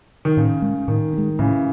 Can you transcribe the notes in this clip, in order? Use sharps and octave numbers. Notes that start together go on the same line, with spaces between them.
D#3
A2 C#3
G#3 C#4
A2 D#3
C#4
G#3
A2 C#3 E3